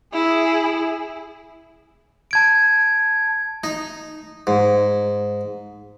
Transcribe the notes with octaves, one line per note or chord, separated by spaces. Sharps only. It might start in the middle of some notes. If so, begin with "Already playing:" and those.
E4 G#4
A5 G#6 D7
D#4
G#2